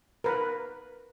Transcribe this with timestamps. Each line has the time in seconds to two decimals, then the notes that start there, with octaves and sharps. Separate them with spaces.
0.24 A#4 B4